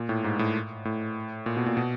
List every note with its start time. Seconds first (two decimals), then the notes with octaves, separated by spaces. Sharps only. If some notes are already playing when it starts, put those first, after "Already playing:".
Already playing: A#2
0.09 A2
0.24 G#2
0.39 A2
0.85 A2
1.46 A#2
1.57 B2
1.66 A#2
1.77 B2